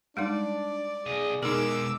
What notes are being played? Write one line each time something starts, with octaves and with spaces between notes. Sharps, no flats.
G3 G#3 D4 D#4 D5
B1 G#4 D#5
B2 G#3 D#4 G#4 A#4 D6 E6